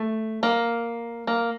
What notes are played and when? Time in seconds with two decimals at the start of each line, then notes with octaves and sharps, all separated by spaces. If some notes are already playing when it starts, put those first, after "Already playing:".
Already playing: A3
0.43 A#3
1.27 A#3